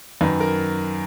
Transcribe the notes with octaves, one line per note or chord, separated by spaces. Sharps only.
F#2 D#3 B4
A#4